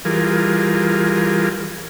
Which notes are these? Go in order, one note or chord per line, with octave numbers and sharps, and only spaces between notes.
E3 G3 F4 G#4 A#4